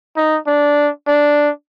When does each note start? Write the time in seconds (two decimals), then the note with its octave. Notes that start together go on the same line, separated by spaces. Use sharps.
0.17 D#4
0.47 D4
1.07 D4